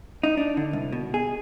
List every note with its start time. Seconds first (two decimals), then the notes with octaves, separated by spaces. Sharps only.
0.23 D#4
0.37 D4
0.57 D3
0.73 C2
0.92 B2
1.14 G#4